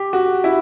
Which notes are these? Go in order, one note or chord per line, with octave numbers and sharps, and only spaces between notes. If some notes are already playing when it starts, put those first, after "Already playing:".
Already playing: G4
F#4
E4